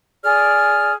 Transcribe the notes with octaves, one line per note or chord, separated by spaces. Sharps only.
G#4 D5 F6